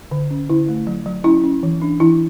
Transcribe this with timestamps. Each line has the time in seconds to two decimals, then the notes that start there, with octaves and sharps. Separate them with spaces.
0.11 D3
0.31 C#4
0.50 D3 E4
0.68 A3
0.87 F#3
1.06 F#3
1.24 C#4 E4
1.44 C#4
1.63 E3
1.82 D4
2.00 E3 E4